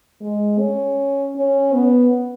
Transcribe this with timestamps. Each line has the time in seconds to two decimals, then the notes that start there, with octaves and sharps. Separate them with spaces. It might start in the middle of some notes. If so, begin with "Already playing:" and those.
0.21 G#3
0.59 C#4
1.36 C#4
1.74 B3